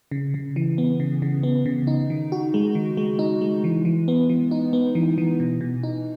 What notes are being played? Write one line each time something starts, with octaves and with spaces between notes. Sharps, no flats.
C#3
C#3
E3
B3
C#3
C#3
B3
C#3
D#4
D#3
F#4
G#3
D#3
G#3
D#4
G#3
E3
E3
B3
E3
D#4
B3
E3
E3
B2
B2
D#4